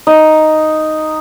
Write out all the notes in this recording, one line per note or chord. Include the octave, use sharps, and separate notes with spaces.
D#4